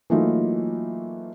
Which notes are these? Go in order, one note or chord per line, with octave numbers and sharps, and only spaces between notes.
E3 F#3 A3 A#3 D#4 F4